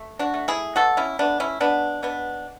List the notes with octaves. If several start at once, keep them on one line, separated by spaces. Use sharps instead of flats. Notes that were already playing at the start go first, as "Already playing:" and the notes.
Already playing: A3
D4 F#4
A3
E4 G#4
B2 F#4 A4
C#4 E4
A3 B3 D4
C#4 E4
B2 B3 D4
B2 B3 D4